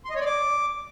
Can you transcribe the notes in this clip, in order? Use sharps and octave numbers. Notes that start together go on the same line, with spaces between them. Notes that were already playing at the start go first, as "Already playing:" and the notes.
C6
D#5
C#5
D5
D6